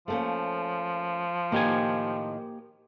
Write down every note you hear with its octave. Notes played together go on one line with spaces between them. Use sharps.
F3 A3 A#3 C#4
A2 D#3 A#3 G4 G#5